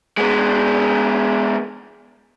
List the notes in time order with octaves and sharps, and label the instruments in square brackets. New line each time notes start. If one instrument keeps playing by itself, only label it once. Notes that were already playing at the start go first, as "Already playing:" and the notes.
[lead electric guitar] G#3 B3